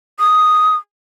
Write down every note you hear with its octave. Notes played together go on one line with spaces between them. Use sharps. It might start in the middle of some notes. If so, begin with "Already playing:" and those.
D#6